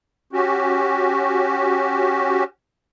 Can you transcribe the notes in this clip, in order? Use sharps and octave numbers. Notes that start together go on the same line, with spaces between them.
C#4 F#4 G4